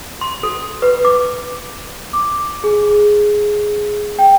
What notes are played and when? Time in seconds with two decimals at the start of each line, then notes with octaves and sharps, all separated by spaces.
0.21 C6
0.43 A4
0.82 B4
1.05 D6
2.13 D6
2.64 G#4
4.19 G5